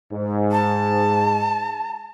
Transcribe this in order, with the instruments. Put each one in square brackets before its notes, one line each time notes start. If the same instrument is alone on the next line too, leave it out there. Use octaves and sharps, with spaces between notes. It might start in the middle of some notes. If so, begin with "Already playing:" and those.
[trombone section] G#2
[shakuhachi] A5